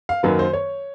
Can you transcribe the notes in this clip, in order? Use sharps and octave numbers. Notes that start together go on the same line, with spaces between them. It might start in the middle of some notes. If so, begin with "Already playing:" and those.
F5
F#2 D#3 F#3 A#3 B4
C5
C#5